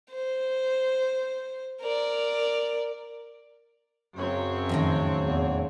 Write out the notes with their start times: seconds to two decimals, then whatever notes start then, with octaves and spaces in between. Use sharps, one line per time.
0.11 C5
1.81 A#4 D5
4.16 F#2 C#3 F#3 C4 C#5
4.69 F2 A2 D#3
5.24 E2